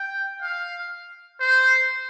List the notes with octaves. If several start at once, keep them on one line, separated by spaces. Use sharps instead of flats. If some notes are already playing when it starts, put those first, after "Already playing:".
Already playing: G5
F5
C5